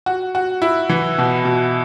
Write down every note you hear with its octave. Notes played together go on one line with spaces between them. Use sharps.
F#4
F#4
E4
E3
B2
B2